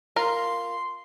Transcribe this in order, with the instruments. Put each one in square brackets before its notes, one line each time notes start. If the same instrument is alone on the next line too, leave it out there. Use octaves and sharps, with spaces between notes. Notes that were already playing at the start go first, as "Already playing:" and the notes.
[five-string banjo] F4 A#4 [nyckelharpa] C6